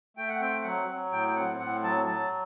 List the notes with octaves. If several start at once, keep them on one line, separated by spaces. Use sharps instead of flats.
A3 G5
F#5
C4 G5
F#3 F#5
F#3
A2 G5
G5
C4 F#5
A2 F#5
F#3 A5
F#3 A5